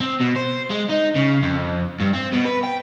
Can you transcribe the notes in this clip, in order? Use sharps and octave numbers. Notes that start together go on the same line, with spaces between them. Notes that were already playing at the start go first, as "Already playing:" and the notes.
C4
B2
C5
G#3
D#4
C#3
F2
G2
C4
B2
B4
G5